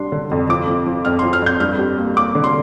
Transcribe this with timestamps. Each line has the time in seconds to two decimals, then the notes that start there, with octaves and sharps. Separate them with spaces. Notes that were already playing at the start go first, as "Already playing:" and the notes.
Already playing: G3 D4 C6
0.12 D3
0.31 F2
0.49 F3 D6
0.68 F3
0.86 F3
1.05 F2 F6
1.19 F3 C6
1.33 F6
1.42 F2 G6
1.60 G2 F6
1.79 G3
1.98 A#3
2.16 A#3 D6
2.35 D3
2.44 C6